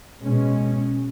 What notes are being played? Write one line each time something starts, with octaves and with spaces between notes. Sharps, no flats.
B2 G#3 C#4